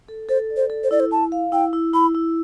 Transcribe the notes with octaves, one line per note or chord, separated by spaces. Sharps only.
A4
A4 C5
D5
C5
A4
C5
E4 D5
C5
E4 A5
F5
E4 G5
E4
E4 B5
E4